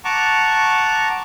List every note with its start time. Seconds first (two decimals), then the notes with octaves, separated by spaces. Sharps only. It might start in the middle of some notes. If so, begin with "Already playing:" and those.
0.05 F#5 A5 A#5 C#6 D6